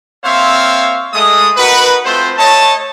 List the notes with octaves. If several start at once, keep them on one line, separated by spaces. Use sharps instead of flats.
A#3 C4 C5 C#5 E5 F5
G#3 A3 D#6
D#4 F#4 A#4 B4
A3 C4 F4 C5
A3 C#5 D#5 A5